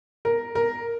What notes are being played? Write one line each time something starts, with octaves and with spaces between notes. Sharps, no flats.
A#4
A#4